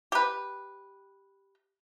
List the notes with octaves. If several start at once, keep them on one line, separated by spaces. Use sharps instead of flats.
G4 B4